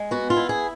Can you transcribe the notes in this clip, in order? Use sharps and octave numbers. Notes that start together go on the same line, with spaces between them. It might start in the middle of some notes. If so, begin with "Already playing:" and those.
Already playing: G#3
B3 F#4
F4
E4
G#4